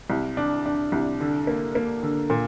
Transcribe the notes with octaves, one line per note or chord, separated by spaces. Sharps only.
C2
D4
D4
C2
D3
A#3
A#3
D3
A#2